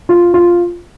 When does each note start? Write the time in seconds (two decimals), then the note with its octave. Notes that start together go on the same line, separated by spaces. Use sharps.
0.09 F4
0.34 F4